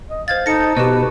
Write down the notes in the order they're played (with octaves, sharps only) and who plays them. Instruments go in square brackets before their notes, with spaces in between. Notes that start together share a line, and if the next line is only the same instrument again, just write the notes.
[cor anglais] D#5
[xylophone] C5 G#6 A6 [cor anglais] F5
[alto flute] D#4 [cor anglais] A4 [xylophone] A#6 C#7
[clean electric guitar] B2 [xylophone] G4 D#5 [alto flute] B4